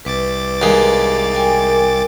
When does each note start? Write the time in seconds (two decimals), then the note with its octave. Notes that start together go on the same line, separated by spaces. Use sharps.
0.05 C2 B4 D6 A6
0.62 D#2 G#3
1.35 A#4 G5 G#5